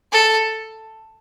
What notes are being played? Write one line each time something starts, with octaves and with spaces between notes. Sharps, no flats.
A4